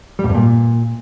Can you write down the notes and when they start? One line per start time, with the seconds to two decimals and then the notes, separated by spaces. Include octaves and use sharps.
0.19 G3
0.24 G#2
0.29 G2
0.34 A#2